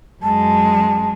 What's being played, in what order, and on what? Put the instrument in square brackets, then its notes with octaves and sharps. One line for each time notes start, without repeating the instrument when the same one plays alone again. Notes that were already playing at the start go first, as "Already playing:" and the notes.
[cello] F#2 G#3 [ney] A5